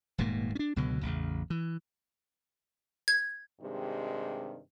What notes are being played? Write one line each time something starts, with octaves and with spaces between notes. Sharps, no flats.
D#1 G#2 B2 A#3
C#4 D4
C#2 B2 D3 F#3
A1 E2 C#3
E3
G#6
G2 C3 D#3 G#3